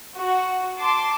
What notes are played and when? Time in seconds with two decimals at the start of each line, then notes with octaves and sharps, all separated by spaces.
0.15 F#4
0.78 A5 C6 D6